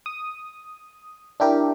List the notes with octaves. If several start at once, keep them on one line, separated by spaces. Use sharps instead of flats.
D#6
D4 E4 G4 A#4